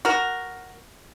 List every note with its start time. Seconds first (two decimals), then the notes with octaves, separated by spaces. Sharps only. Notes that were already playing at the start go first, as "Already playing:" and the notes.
0.05 F#4 A#4